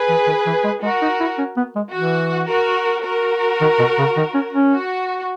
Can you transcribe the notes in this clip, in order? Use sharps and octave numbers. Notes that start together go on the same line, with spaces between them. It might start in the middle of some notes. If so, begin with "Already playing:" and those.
Already playing: G#4 B4
E3
D#3
E3
G#3
G#3 F#4 A#4
D#4
E4
C#4
B3
G#3
E3 F#4
F#4 A#4
F#4 A#4
D#3
B2
C#3
D#3
C#4
C#4
F#4